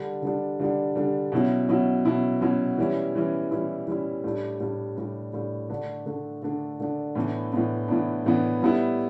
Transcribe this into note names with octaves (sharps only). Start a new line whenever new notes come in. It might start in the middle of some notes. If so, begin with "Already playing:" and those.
Already playing: D3 G3 D4
D3 G3 D4
D3 G3 D4
D3 G3 D4
B2 F#3 C#4 E4
B2 F#3 C#4 E4
B2 F#3 C#4 E4
B2 F#3 C#4 E4
E3 G3 C#4 E4
E3 G3 C#4 E4
E3 G3 C#4 E4
E3 G3 C#4 E4
A2 G3 D4
A2 G3 D4
A2 G3 D4
A2 G3 D4
D3 A3 D4
D3 A3 D4
D3 A3 D4
D3 A3 D4
A2 E3 B3 D4
A2 E3 B3 D4
A2 E3 B3 D4
A2 E3 B3 D4
A2 G3 B3 E4